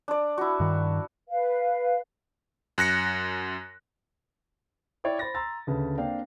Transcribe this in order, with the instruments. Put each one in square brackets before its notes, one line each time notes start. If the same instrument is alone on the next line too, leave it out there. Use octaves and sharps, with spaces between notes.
[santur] D4 D5
E4 F#4
[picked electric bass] G2 D#3
[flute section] B4 F5
[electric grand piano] F#2 F#6 A#6 C#7
[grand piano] E4 C#5 D5 E5 G5 D6
C5 B5 A6 A#6
A#5 C6 E6 A6
D2 C#3 B4 A5
A#3 C4 D4 F5 G5